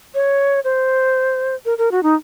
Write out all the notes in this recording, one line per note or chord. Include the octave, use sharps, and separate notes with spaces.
C#5
C5
A#4
A#4
F#4
D#4